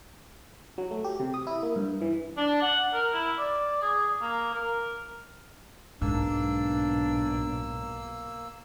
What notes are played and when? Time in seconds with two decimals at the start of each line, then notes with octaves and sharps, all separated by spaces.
0.78 F#3
0.91 A3
1.04 G4
1.20 C3
1.34 D#6
1.47 E4
1.62 A#3
1.76 G2
2.01 E3
2.37 D4
2.62 F#5
2.93 A#4
3.13 E4
3.38 D5
3.82 G#4
4.21 A#3
4.54 A#4
6.01 B1 G#2 A#3 D4 E6